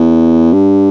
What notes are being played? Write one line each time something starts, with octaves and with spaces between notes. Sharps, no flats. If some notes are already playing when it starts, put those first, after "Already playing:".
Already playing: E2
G2